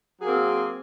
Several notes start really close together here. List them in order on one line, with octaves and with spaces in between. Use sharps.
F#3 G#4 A#3 C4